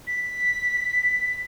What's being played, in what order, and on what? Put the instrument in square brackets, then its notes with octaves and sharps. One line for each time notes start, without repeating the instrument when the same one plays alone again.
[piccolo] B6